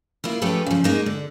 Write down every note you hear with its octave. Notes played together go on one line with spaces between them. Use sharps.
A#3 E4 F4
F3 A3 C#4 G4 A4 B4
C#3 F3
G#3 A#3 D#4
D3